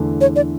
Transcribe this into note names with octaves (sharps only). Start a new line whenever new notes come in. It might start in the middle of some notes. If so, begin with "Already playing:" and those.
Already playing: E2 D3 A3 E4
C#5
D5